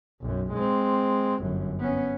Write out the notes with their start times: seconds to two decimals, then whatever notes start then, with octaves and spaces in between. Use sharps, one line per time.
0.22 B1 F#2
0.53 G#3 C4
1.42 G1 F#2
1.80 B3 C#4